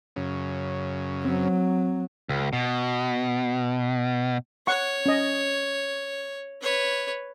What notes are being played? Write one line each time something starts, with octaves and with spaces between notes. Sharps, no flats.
F#2 C#3
F#3 C4
C#2
B2
C#5 F#5 C#6
C#4 D#5
B4 C#5